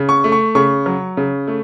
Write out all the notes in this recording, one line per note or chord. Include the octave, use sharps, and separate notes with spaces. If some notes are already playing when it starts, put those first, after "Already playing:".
Already playing: C#3
C#6
A3
C#6
C#3 C#6
F#3
C#3
A3